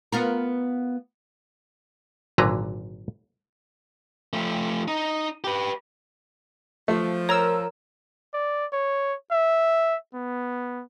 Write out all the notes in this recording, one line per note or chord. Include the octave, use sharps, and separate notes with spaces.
B3 F4 A#4
G#1 A#2 D3 F#3 B4 A#5
F3 A3
D#4
G4 B4
F3 A3
A#4 C#5 A#5 E6
D5
C#5
E5
B3